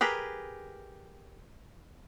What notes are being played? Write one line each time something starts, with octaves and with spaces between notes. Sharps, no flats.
G4 G#4 A#4 B4